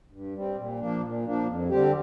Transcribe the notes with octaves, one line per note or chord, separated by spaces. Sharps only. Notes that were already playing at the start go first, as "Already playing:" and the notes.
G2
G3 C4
A#2
F3 A#3 D4
A#2
F3 A#3 D4
F2
D3 G3 C4 G4